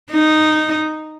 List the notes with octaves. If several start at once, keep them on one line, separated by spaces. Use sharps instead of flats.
D#4